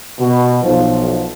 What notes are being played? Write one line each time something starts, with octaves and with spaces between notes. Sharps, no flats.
B2
B1 F3